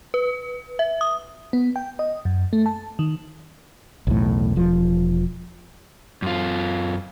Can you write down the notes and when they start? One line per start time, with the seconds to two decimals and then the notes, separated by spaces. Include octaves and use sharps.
0.14 B4
0.79 E5
1.01 D#6
1.53 B3
1.76 G5
1.99 D#5
2.25 F#2
2.53 A3
2.66 A5
2.99 D#3
4.07 B1 E2 A2
4.56 E1 F3
6.22 F#2 F4